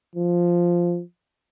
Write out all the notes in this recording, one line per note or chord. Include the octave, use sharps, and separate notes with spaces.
F3